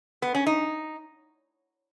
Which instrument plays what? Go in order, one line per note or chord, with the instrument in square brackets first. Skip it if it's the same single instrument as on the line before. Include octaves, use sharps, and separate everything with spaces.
[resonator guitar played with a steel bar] B3
C#4
D#4